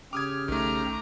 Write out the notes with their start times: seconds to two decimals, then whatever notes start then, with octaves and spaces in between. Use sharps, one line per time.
0.13 C#3 G4 D6 D#6 F6 G#6
0.48 B1 D#3 A3 A#5 D6